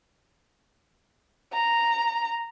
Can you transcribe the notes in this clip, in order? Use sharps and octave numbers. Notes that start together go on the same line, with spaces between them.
A#5